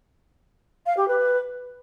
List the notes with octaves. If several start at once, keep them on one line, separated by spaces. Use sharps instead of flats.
F5
G4
B4